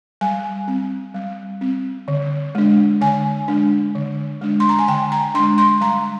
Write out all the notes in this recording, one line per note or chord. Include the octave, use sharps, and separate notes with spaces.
G3 G#5
C4
G3
C4
D3
G#3 D4
D3 G#5
G#3 D4
D3
G#3 D4
C6
A#5
G#5
D3 G5
A#5
G#3 D4 C6
C6
G3 A#5